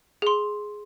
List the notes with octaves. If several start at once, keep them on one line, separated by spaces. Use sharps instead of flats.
G#4 C6